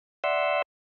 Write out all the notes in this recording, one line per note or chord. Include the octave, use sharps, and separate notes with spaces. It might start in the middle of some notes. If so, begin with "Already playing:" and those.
D5 E5 F#5 C6 E6